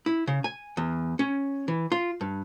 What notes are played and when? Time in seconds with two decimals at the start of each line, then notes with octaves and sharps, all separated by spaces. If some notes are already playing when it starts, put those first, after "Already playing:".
0.06 E4
0.27 C#3
0.44 G#5
0.77 E2
1.19 C#4
1.68 E3
1.92 F4
2.21 G2